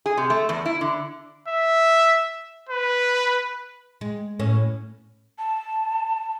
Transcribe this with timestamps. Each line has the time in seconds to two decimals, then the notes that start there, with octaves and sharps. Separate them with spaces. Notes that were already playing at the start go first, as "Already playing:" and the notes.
0.06 G#4
0.17 C3
0.30 A3
0.49 E2
0.66 E4
0.81 D3
1.48 E5
2.69 B4
4.01 G#3
4.39 A2 C#4
5.38 A5